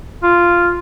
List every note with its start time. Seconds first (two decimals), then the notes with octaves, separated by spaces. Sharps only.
0.23 F4